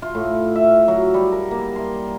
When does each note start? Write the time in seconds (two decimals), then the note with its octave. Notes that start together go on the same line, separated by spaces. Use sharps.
0.02 F4
0.15 A2
0.56 E5
0.88 F#3
1.14 G3
1.32 A#4
1.51 A#3
1.76 C6